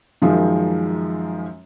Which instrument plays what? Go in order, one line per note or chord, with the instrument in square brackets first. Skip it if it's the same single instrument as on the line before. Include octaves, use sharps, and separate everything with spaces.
[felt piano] F#2 D#3 F3 G#3